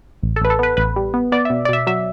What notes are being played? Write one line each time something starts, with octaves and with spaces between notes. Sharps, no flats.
A1
A4
A1 B4
A4
B3 B4
A1 B4
G3
B3
B3 D5
B2 E5
D5
B2 E5
F#3 E5